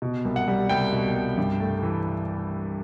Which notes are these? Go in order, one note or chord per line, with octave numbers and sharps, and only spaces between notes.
B2
C2
F#5
G3
C2 G5
B2
C2
G2
A3
E3